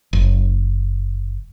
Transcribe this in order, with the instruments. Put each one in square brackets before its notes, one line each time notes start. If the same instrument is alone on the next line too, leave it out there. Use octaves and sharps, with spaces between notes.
[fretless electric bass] F#1